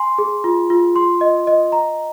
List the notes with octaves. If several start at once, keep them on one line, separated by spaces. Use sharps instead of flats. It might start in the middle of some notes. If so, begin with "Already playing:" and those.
Already playing: G#5 C6
G#4
F4
F4
C6
D#5
D#5
A#5